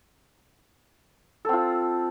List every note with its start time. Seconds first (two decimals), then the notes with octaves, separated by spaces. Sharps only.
1.45 A4
1.49 C4
1.53 F4